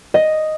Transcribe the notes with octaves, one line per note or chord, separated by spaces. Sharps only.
D#5